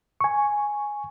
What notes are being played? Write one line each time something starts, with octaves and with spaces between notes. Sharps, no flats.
G#5 C#6